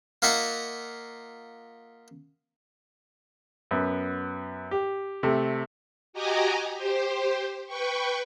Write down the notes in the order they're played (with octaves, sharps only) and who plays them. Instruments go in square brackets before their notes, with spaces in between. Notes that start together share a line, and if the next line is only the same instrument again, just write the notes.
[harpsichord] A#3 F4 D#5 E5 F#5 A#5
[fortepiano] F#2 B3
G4
C3 A3
[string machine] F#4 G4 D#5 G#5 A#5 D6
G4 C5
B4 G5 C#6